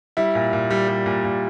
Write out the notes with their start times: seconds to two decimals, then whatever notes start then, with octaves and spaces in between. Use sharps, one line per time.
0.17 G3 E4
0.35 A#2
0.53 A#2
0.70 G3
0.88 G3
1.06 A#2
1.25 A#2